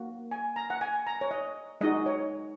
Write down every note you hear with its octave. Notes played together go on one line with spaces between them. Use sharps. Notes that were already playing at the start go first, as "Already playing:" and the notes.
Already playing: A#3 F#4
G#5
A#5
F#5
G#5
A#5
C#5
D#5
G#3 D#4 F#4 D#5
C#5